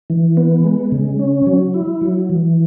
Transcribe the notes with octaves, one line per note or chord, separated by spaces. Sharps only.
E3
B3
G#3
C#3
C#4
F#3
E4
F#3
E3